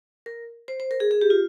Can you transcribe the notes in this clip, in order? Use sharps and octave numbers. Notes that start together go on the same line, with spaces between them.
A#4
C5
C5
A#4
G#4
G#4
G4
F4